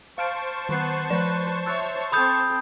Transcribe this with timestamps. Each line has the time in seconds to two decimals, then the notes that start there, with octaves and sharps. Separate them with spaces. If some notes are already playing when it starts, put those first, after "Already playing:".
0.18 C5 F5 A5 C#6 F6 D7
0.69 D#3 B3 B4 C7
1.10 F3 B4 D5 E7
1.66 C#5 E5 E6 F#6 A6
2.12 C4 A4 B5 D#6 G6